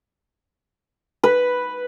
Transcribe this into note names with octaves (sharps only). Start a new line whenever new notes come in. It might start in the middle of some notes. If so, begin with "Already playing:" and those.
B4